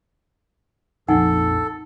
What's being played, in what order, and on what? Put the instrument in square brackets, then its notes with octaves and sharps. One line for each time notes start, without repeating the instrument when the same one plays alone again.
[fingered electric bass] A#1 F2 [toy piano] D#4 F#5 G#5 [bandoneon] A4